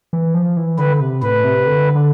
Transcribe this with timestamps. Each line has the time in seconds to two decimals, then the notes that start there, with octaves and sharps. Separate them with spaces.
0.13 E3
0.34 F3
0.57 E3
0.78 D3 B4
1.00 C3
1.22 A2 B4
1.44 C3
1.66 D3
1.95 D3